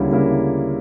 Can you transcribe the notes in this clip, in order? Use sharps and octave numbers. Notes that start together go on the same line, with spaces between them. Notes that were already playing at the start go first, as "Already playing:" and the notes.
Already playing: D2 C#3 G3 A#3 E4
C#3 G3 A#3 E4